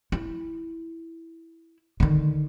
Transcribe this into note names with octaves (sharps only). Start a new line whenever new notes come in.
E4
D3 D#3